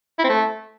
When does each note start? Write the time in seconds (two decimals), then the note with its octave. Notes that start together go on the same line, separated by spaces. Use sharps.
0.19 E4
0.24 C4
0.29 A3